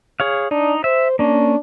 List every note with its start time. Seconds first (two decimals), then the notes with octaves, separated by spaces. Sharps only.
0.20 G#4 C#5 F5
0.51 D4 D#4
0.84 C5 E5
1.19 A#3 C#4 D4